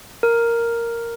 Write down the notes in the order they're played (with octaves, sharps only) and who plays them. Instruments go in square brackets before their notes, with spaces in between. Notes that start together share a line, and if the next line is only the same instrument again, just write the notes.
[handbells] A#4